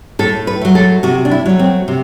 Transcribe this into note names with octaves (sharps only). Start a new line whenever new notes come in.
A2 A4
B4
F#3 A3
A4
C3 F#4
D4
E4
F#3 A3
C4
C3